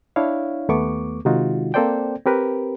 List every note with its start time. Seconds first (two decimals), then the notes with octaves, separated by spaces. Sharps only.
0.16 D4 E4 C#5 F5
0.69 D#2 A3 B3 C#6 D6
1.25 C3 D#3 G#3 D#4 F4 F#4
1.74 A#3 C4 A4 C5 D5 G5
2.26 C4 G4 A#4 B4